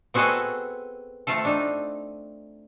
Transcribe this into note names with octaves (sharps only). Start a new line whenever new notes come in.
B3 C4 F#4 G#4 A4 D#5
A3 C4 F4 A4
D4 D#4